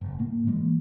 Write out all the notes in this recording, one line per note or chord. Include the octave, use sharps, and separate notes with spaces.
F#1
A2 A#3
E3 G#3 A#3